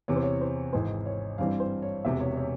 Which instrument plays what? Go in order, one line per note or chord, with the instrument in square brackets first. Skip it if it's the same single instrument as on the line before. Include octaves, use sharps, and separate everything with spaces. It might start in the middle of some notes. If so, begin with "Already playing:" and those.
[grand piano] E2 C3 E3 C#5
C5
C#5
C5
G#1 G#2 E3 C5
C#5
G2 E3 G3 C4 F5
C5
C#5
E1 E2 C3 E5
C#5
C#5